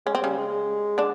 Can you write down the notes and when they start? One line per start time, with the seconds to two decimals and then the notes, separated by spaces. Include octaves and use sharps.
0.06 G#3 C#4
0.15 C4
0.22 C#3 G3 C#4
0.37 G#3
0.98 D3 D4